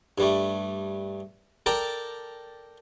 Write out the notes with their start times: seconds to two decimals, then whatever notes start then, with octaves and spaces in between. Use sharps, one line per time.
0.18 G2 G3 A3
1.66 A4 A#4 D5 G5 A5 A#5